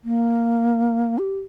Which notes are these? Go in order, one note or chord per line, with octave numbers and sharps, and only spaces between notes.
A#3
G4